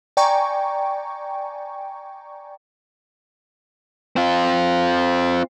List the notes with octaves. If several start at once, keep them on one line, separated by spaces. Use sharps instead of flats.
D5 G5 G#5 A#5 C#6
C4 F4